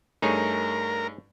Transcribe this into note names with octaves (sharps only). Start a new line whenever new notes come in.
G2 A3 D#4 G#4 A#4 C#5